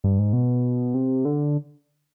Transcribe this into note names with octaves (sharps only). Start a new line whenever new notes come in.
G2
G#2
B2
C3
D3